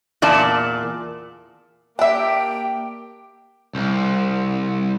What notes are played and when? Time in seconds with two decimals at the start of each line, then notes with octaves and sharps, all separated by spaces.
0.22 E2 A#2 D5 A5
1.99 A#3 D4 G4 E5 G5
3.75 C2